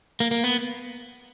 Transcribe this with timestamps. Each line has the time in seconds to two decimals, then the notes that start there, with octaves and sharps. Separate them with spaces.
0.20 A#3
0.31 A#3
0.44 B3